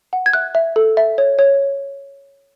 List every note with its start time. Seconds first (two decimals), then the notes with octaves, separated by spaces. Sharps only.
0.13 F#5
0.26 G#6
0.33 E5 F#6
0.55 E5
0.76 A4
0.97 E5
1.18 C#5
1.39 C#5